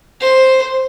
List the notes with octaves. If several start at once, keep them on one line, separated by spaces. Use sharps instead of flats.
C5